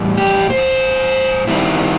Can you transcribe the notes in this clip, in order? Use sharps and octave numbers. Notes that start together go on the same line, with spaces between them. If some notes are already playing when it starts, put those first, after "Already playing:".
Already playing: A2 E3 G3
G4
C5
D#3 G3 C4 E4